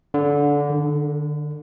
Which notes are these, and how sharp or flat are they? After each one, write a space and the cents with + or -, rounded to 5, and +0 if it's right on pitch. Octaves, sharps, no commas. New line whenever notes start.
D3 -20
D3 +35